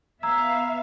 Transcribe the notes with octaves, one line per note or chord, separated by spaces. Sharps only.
B3 E5 F5 A#5 E6 G#6